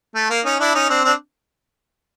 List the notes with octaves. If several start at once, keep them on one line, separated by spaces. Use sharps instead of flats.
A3
A#3
C#4 D#4
D4 E4
C#4 D#4
C4 D4
C4 D4